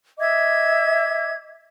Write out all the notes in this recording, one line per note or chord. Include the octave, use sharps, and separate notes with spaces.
D#5 E5 D6 G#6